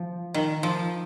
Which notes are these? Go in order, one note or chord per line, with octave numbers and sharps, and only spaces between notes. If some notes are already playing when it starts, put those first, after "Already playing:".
Already playing: F3
D#3
F3